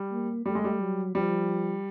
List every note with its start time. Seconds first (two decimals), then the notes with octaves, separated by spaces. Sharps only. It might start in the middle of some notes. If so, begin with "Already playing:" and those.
Already playing: G3
0.11 A#3
0.46 G3 A3
0.55 G#3
0.64 G3
0.80 F#3
1.15 F3 G3